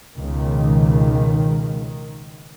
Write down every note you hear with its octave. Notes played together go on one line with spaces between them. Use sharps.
C#2 B2 D#3